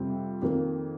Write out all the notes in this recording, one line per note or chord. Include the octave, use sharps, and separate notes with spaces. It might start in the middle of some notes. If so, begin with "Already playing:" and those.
Already playing: F2 C3 G3 C4 F4
F2 D#3 A#3